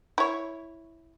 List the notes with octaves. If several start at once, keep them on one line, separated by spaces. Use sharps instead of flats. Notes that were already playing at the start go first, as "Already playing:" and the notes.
E4 C#5